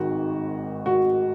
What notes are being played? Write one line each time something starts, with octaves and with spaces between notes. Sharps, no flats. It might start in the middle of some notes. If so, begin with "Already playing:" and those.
Already playing: G#1 G#2 D#3 F#4
F#4